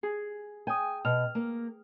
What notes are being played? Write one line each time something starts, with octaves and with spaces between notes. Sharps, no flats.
G#4
G5 G#5 D#6
B2 F6
A#3